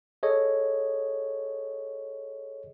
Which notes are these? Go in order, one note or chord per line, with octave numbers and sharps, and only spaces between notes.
G#4 A4 C#5 D#5